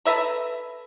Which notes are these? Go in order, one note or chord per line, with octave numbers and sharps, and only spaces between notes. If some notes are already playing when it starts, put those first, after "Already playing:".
A4 B4 E5 A#5